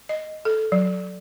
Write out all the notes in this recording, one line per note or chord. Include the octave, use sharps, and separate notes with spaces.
D#5
A4
F#3